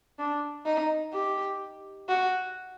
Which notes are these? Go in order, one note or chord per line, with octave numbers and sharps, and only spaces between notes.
D4
D#4
G4
F#4